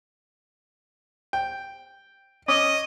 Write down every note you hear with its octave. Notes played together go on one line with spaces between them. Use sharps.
G5
C#4 D#5 D6 D#6